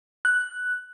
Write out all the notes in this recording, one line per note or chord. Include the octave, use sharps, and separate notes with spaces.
F#6